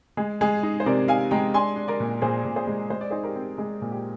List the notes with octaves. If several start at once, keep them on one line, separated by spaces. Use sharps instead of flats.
G#3 G#4
G#3 G#4
D#4
C5
C3 A#4 D5
D#4 F5 G#5
G#3 G5 A#5
D4 G#5 C6
D4
A#4 D5
A#2
A#2 G#4 C5
A#2
G#4 C5
G#3
G#3 C5
D5
D#4 G#4 C5
G4 A#4
C4
G#3 G#4
A#2
G4